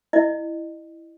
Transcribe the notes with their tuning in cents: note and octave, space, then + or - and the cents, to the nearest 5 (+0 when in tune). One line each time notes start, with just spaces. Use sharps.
E4 +0 D#5 -30